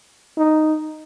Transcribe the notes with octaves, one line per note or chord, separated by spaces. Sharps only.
D#4